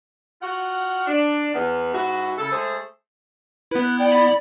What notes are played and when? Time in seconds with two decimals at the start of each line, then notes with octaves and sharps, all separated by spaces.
0.42 F4 F#4 F#5
1.07 D4
1.54 E2 B3
1.94 G#2 E4 F#4
2.38 C#3 E4 A4
2.52 G#3 A3 G#4 A4 C5
3.71 B3 E4 B4
3.83 F#6
3.99 D5 G5
4.10 B5